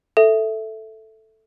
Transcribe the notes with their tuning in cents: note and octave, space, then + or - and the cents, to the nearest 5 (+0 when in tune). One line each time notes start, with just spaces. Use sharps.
A4 +0 E5 +0